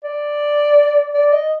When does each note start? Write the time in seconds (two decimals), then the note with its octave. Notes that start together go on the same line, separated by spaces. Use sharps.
0.04 D5
1.14 D5
1.32 D#5